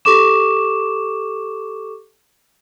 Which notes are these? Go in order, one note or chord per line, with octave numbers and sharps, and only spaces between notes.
G4 A4 C#6 D6 E7